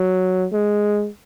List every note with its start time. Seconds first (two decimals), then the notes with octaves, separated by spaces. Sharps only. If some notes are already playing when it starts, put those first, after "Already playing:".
Already playing: F#3
0.53 G#3